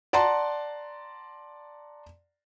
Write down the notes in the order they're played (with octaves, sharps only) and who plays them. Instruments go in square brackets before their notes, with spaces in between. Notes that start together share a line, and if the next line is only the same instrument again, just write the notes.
[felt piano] D5 F#5 A5 A#5 C6